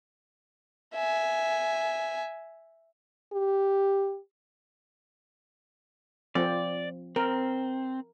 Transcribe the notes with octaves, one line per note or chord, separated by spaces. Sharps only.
E5 G#5
G4
F3 C4 D5
C4 A#4